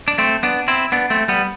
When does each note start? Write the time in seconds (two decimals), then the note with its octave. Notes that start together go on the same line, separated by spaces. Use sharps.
0.08 D4
0.18 A3 C4
0.43 B3 D4
0.68 C4 E4
0.92 B3 D4
1.10 A3 C4
1.28 G3 B3